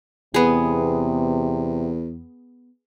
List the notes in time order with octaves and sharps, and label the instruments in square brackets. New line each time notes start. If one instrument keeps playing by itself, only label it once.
[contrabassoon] E2 [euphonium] C3 [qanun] B3 G#4